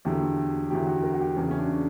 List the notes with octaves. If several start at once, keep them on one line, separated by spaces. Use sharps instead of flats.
E2 D3 F#3 G4
E2 D3 F#3 G4
F#4
A#4
F#4
G4
E2 C#3 E3 C#4
C#4
D4